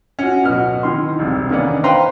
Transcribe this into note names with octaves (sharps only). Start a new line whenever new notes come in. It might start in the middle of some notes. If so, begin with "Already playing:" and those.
C#4 F#4
D1 B2 F#4 F6
D#3 E3 C6
E1 C2 C3
D#3 A#3 B3 C#4 D4
B4 C5 F5 G5 A#5 C6